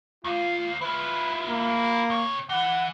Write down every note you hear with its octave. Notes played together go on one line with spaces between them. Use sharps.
D#2 F4 F5
E4 F4 B4
A#3
C3 C#5
E3 F#5